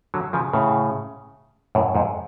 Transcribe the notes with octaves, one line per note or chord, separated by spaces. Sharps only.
D3 F#3
C#3 F3
A2 C#3
F#2 A2
F2 G#2